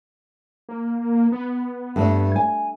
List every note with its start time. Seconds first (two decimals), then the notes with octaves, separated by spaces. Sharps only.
0.69 A#3
1.32 B3
1.96 G2 A3 E5
2.36 G#5